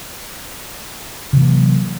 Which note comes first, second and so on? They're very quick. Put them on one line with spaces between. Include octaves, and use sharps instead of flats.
C3 E3 A#3 F#3